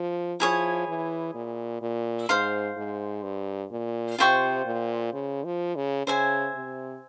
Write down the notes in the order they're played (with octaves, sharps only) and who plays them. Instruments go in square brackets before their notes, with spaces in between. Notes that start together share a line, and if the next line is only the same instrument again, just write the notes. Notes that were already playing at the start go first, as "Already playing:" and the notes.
Already playing: [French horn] F3
[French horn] F3 [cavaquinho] E4 G#4 C#5
[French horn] E3
A#2
A#2
[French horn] G#2 [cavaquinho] C5 F5 C6
[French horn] G#2
G2
A#2
[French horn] C3 [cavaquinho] F4 C5 G5 C#6
[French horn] A#2
C#3
F3
C#3
[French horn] C#3 [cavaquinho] C5 E5 G#5
[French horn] C3